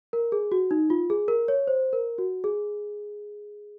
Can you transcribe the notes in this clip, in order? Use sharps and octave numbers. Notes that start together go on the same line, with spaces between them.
A#4
G#4
F#4
D#4
F4
G#4
A#4
C#5
C5
A#4
F#4
G#4